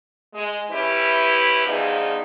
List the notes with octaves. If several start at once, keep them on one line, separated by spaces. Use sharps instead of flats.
G#3
E3 C#4 E4 G4 B4
E2 G2 F3 D#4 G#4